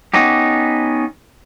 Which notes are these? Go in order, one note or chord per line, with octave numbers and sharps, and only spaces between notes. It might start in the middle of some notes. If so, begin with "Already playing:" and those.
B3 C#4 D#4 G4